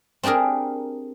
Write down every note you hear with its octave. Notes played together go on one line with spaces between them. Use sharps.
C4 D4 G4 G#4 A#4